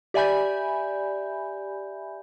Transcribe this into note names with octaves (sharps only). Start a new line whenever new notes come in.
G4 D5 E5 G#5 B5 G6